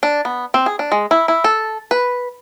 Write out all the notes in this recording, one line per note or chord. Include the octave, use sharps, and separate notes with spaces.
D4
B3
C4
G#4
D4
G#3
E4
E4
A4
B4